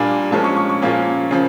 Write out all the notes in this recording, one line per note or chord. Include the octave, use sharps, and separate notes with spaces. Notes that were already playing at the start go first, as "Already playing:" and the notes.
Already playing: A#2 G3 A#3 D4 G#5
A#2 F3 G#3 C#4 A5
C#6
C#6
C#6
A#2 F3 A#3 C#4
C#3 F3